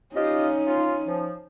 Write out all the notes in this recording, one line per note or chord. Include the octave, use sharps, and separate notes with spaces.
C#4 D#4 F4 G4 D#5
F4
F3